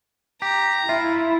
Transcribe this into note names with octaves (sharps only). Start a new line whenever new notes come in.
G4 A#5
E4 F4 E5